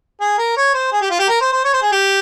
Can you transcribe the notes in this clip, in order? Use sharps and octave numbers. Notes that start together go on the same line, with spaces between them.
G#4
A#4
C#5
C5
G#4
G4
F4
G4
A#4
C5
C5
C#5
C5
G#4
G4